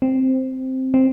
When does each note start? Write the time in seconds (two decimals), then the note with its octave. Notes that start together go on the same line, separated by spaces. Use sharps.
0.02 C4
0.94 C4